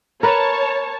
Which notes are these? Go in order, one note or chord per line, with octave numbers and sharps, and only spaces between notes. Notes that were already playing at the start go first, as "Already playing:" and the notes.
A#4 B4 C#5 A5